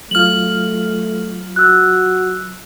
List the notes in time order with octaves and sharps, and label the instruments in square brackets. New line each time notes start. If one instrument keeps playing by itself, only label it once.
[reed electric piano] F#3 F4 [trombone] A3 [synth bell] F6 F#7
[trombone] F#4 [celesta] E6 F#6